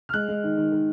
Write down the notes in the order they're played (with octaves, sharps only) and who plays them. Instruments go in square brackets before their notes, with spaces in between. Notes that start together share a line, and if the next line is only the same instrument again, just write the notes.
[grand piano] F6
G#3 F#6
G#3
D#3
D#3
D#3